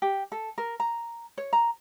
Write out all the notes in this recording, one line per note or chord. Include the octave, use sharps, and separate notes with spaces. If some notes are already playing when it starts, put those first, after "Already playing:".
G4
A4
A#4
A#5
C#5
A#5